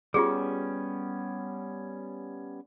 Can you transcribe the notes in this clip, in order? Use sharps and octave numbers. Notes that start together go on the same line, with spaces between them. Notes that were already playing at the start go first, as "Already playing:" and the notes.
G3 B3 C#4 F4 G4 G#4